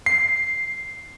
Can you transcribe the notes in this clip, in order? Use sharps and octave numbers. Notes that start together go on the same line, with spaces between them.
C7